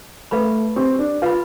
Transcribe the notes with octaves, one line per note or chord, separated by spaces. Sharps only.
A3 B4 F5 B5
C4 G4
D4
F4 B4 F5 B5